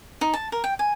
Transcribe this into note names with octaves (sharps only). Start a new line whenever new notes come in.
D#4
A5
A#4
G5
G#5